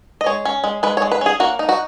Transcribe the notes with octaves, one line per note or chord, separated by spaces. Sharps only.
D#5
G#3 C#5
C#4
G#3
G#3 B4
C#5
G#3
B4
C#4 G#4
A#3 F#4
D#4
F#4